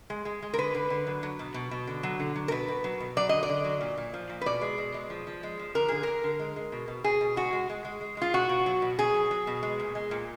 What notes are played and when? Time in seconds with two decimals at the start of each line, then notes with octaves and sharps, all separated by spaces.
0.10 G#3
0.25 G#3
0.42 G#3
0.54 A#4
0.58 D3 B4
0.75 D3
0.90 D3
1.07 F#3
1.23 F#3
1.39 B2
1.54 B2
1.71 B2
1.87 D3
2.03 F#3
2.20 D3
2.36 F#3
2.48 A#4
2.51 B2 B4
2.68 B2
2.84 F#3
3.00 B2
3.17 F#3 D5
3.29 D3 D#5
3.43 D5
3.49 D3
3.64 F#3
3.81 A#2
3.98 A#2
4.14 F3
4.29 A#2
4.41 B4
4.46 B2 D5
4.61 G#3
4.78 B2
4.94 G#3
5.10 F3
5.27 F3
5.43 G#3
5.59 F3
5.75 D3 A#4
5.88 D3 G#4
6.03 D3 A#4
6.23 D3
6.39 G#3
6.56 G#3
6.72 B2
6.88 B2
7.04 B2 G#4
7.21 B2
7.36 G#3 F#4
7.53 G#3
7.70 G#3
7.85 G#3
8.01 G#3
8.17 G#3 F4
8.33 B2 F#4
8.49 B2
8.66 F#3
8.82 B2
8.99 B2 G#4
9.14 F#3
9.31 F#3
9.47 B2
9.63 G#3
9.80 A#2
9.95 G#3
10.11 A#2